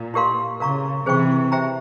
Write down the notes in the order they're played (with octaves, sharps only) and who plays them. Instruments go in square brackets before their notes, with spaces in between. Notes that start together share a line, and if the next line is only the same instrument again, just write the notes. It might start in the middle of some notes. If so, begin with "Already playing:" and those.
Already playing: [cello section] A#2
[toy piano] E4 G4 A#4 F5 C6
[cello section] C#3 [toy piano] A#4 F5 A#5 C#6
[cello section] C3 E3 [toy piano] G#4 C5 G5 C#6
[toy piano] G4 C5 E5 G5 A#5